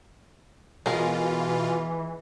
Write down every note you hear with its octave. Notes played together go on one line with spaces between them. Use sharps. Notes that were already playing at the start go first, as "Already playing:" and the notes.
B2 E3 G#3 F4 A#4